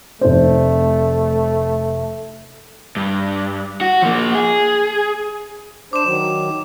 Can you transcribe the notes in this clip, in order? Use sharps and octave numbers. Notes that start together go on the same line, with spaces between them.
F1 A3 C5
G2
F#4
F3 A#3
G#4
D4 C5 D6 E7
D#3 F#3